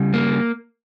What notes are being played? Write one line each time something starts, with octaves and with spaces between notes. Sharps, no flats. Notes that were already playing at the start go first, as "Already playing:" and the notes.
Already playing: C#3 G3
A#3